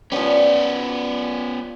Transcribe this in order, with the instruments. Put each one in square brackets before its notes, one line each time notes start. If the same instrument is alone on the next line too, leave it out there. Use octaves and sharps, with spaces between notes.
[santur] F3 G3 [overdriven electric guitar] B3 C#4